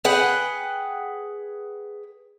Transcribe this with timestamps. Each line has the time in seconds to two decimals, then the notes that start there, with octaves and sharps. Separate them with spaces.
0.05 G#4 B4 F#5 G5